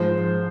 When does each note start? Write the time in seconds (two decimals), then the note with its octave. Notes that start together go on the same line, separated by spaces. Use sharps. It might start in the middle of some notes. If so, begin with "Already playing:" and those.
Already playing: G#2 F3 G#3 C5